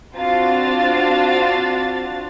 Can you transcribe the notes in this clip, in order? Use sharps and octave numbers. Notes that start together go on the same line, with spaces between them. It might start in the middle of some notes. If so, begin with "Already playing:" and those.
C4 D4 F4 F#4 F5 A6